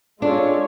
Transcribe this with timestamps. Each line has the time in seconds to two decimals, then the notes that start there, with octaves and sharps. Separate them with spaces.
0.22 G#3 C#4 D4 F4 A4 C#5